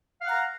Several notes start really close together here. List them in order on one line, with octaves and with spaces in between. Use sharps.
F5 F#5 A#5